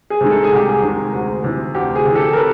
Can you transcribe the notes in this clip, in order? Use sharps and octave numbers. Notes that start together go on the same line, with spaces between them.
G#4
C3 D#3 G#3
A4
G#4
C2 G4
G#4
C3 D#3 G#3
D2
C3 E3
D2 G4
G#4
C3 E3
G4 A4
A#4
A4 B4